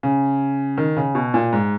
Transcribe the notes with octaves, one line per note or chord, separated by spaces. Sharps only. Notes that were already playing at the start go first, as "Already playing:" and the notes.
C#3
D#3
C#3
B2
A#2
G#2